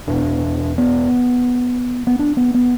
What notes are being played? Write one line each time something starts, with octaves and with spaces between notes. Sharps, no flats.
E2 B2 D4
B3
B3
D4
B3
B3